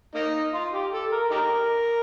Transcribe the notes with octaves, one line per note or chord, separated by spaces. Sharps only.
A#3 D#4
F4
G4
A4
A#4
D#4 G4 A#4